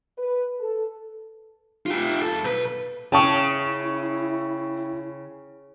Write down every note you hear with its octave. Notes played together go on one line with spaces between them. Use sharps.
B4
A4
F4 G4
F#2 A4
B1 B4
C#3 E4 G5 A5 C#6